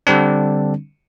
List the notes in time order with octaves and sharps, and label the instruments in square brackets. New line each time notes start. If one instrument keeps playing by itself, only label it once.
[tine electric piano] D3 G3 C4 D4